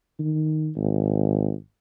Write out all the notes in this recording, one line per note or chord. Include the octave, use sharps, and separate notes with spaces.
D#3
G#1